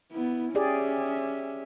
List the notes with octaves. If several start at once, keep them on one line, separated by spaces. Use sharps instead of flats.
B3 E4
C#4 G4 G#4 D5 E5